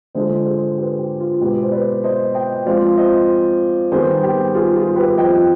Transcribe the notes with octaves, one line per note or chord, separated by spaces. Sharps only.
D3 G#3 D4 F4 C5 D#5
G#4 C5
G4 B4
G4
F4
B2 G#3 B3 G4
C5
B4 D5
C5 D#5
D#5 G5
F3 G#3 C4 D5 F5
C5 D#5
D#3 G3 B3 G#4 C5
G4
F4 G#4
F4 G#4
G4 B4
F3 C4 F4 D#5 G5